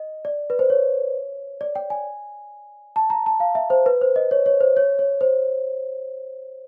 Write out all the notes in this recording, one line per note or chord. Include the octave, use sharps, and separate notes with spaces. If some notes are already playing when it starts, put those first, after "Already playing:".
Already playing: D#5
D5
B4
C5
C#5
D5
G5
G#5
A5
A#5
A5
F5
E5
C5
B4
C5
D#5
C#5
C#5
C5
C#5
C#5
C5